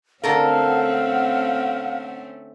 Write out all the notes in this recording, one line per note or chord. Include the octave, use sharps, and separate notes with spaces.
D3 A3 C4 C#4 A4 A#4 F5 F#5